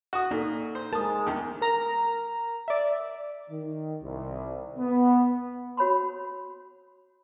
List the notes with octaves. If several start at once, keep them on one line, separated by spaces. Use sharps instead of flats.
F#4 D#6
A#2 D#4 A4
C5
G#3 A#4 A5 D#6
E2 D#3
A#4 A#5
D5 E5
D#3
C2
B3
F#4 C#5 B5 C6